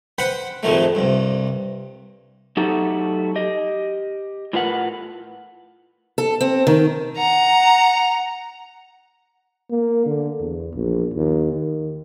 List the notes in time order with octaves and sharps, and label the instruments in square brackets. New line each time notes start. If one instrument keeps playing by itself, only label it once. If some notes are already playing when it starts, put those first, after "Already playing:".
[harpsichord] B4 C5 F#5 G5 B5 C6
A#1 F2 A2 D#3 F3 A3
C2 G2
[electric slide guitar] F#3 A3 D#4 F#4 G4 A4
G4 D#5
A2 D4 F4 A#4 B4 F#5
[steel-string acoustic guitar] A4
C4
D#3
[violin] F#5 A#5
[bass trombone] A#3
D3
E2
A#1
D#2
D#3